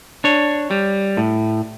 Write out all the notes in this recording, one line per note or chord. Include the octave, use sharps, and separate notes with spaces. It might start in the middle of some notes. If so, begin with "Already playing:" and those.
D4 C#5
G3
A2